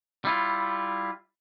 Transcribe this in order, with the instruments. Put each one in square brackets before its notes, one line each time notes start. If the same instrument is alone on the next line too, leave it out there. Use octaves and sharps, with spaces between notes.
[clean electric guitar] G3 E4 F4